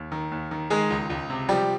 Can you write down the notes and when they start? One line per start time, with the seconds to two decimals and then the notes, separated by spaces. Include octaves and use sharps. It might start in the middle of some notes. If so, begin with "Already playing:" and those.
Already playing: D#2
0.12 D#3
0.32 D#2
0.51 D#3
0.70 D#3 G#3 G#4
0.90 C#2
1.10 C#2
1.30 C3
1.49 F3 G3 G4